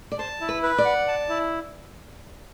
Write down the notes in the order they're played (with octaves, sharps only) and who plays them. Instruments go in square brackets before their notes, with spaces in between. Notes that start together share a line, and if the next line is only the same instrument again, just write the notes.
[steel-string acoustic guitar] D5
[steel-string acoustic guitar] C5 [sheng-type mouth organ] A5
[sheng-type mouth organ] E4
[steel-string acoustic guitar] B4
[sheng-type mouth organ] B4
[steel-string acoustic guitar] D5
[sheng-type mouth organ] F#5
A5
E4